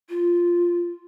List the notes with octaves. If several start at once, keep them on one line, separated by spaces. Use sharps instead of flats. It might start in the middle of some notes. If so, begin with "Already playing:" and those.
F4